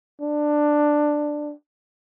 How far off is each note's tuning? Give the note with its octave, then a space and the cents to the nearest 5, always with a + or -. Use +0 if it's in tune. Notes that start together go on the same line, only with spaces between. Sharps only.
D4 +10